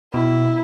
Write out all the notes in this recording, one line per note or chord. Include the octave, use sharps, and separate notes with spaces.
B2 E4